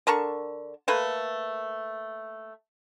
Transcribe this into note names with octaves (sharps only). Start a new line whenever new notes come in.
D3 A#4 A5 C#6
A3 A#3 B4